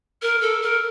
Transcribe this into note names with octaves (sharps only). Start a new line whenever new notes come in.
A#4
A4
A#4